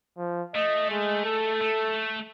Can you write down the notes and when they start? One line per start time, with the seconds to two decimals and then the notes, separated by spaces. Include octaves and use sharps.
0.18 F3
0.55 A3 D#5
0.90 G#3
1.25 A4
1.61 A3